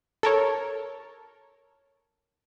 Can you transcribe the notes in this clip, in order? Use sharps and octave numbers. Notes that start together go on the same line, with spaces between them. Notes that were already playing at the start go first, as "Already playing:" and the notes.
A4 A#4 C#5